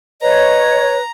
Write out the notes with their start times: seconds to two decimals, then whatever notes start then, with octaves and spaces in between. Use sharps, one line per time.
0.22 B4 C#5 D#5 A#5